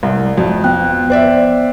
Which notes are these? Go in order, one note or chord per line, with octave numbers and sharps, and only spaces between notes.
C2
F2 F#4
B3 G5 F#6
C5 D5 E5